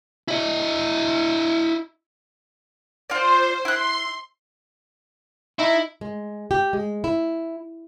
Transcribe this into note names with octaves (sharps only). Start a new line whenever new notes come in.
E4 D#5
F4 C5 D5
E4 C6 F#6
D#4 E4
G#3
G4
G#3
E4